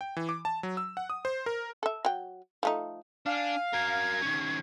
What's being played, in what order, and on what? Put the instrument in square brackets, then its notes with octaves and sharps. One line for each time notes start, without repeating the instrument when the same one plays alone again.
[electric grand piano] G5
E3
D6
A5
F#3
E6
F#5
D#6
C5
A#4
[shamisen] A4 E5
F#3 G5
F3 A3 D#4
[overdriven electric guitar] D4 [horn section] F5 [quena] G#5
[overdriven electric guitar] F#4 A#4 [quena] G#6
[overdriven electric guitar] D#3 C#4